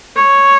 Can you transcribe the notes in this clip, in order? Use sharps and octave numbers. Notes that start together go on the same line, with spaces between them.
C#5